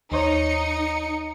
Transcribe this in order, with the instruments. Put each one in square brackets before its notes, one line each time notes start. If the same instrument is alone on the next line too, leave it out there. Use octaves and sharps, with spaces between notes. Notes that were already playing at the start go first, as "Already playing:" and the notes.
[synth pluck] D#2 C5 C#5 [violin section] D#4 C#7